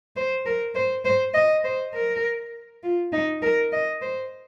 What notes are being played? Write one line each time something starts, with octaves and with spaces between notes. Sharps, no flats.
C5
A#4
C5
C5
D#5
C5
A#4
F4
D#4
A#4
D#5
C5